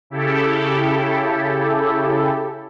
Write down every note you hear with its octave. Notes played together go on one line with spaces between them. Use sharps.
C#3 E4 G4 A4